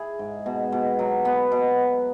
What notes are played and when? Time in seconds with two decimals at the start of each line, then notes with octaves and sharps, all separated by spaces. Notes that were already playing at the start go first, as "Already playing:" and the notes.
Already playing: E4 G#4
0.19 G#2
0.46 B2
0.72 B2
0.99 F#3
1.25 B3
1.52 B2